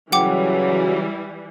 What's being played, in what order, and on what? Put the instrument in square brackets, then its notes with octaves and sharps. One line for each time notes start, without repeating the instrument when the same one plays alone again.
[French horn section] C#3 F#3 [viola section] E3 G3 [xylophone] F#5 G5 D6